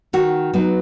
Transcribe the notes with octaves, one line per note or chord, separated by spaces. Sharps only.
D#3 F#4
F#3 B3 D#4